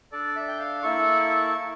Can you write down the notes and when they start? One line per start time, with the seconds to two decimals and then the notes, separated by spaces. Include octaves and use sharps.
0.12 D4 A4 D5
0.36 E5
0.48 G5
0.59 F5
0.82 A#3 E4 A4 C#6